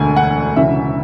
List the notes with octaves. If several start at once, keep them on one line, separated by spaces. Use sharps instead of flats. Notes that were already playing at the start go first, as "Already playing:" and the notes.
Already playing: E1 D2 D3 A3 G#5
F#5
E1 D2 C#3 E3 E5